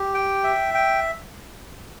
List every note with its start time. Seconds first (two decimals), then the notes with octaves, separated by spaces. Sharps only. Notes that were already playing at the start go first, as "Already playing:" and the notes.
Already playing: G4
0.14 G5
0.44 E5
0.74 G5